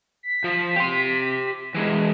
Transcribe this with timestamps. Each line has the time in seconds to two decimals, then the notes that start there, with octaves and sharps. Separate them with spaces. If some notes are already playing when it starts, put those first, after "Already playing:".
0.23 B6
0.44 F3
0.76 G4 C6
1.74 E3 G#3